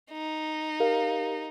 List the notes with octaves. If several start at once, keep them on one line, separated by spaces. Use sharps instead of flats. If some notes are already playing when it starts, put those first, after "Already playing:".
D#4
G4 A#4 F5